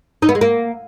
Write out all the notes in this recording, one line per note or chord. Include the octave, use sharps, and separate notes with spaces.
D#4
B3
G#3
A#3